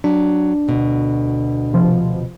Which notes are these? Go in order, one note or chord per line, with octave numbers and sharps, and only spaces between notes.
F#3 D4
D2 B2
C3 F3